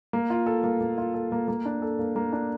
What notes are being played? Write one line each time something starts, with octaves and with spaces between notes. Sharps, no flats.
A#3
F4
A4
A#3
A#3
F4
A4
A#3
A#3
D4
A4
A#3
A#3
D4